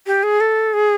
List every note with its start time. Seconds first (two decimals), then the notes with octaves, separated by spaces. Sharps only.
0.07 G4
0.23 G#4
0.40 A4
0.74 G#4